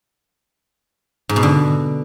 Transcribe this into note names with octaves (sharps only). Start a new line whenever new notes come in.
G#2
B2
D3